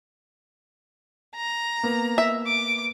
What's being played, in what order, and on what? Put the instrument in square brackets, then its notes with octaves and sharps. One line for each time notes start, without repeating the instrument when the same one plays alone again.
[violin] A#5
[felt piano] A#3 B3
[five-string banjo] E5
[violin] D6